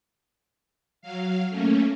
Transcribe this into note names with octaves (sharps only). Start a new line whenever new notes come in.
F#3 F5
A3 A#3 C#4